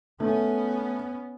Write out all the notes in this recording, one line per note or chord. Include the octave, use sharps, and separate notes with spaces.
A3 B3 C#4